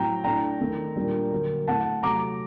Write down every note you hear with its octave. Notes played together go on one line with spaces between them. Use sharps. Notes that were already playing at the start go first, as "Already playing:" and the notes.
Already playing: A2 F#3 C4 G5 A#5
A2 A3 D4 G5 A#5
D#3 A3 C4
A#2 G3 A#3 D4
D3 F#3 A#3
A2 A3 C4 F#5 A5
C3 F#3 A3 A#5 D6